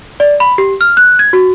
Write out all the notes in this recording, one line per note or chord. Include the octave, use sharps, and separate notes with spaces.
D5
B5
G4
F6
F#6
G#6
F#4